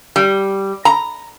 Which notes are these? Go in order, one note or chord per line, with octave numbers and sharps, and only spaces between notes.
G3
A#5